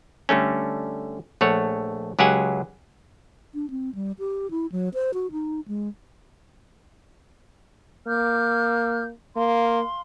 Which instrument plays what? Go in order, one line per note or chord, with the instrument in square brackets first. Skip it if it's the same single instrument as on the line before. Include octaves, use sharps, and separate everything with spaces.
[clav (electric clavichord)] D3 G3 A3 C#4
A#1 A3 C#5 F#5
C#2 F#3 G4 G#4 F#5 G#5
[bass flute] D4
C4
G3
G4
E4
F#3
C5
F#4
D#4
G#3
[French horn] A#3 [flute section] D6 F6 G6
[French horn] A#3 [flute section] F5 C6